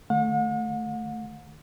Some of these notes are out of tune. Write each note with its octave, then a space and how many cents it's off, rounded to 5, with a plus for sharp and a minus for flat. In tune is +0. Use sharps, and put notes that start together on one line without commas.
D#3 -45 A3 +0 F#5 -45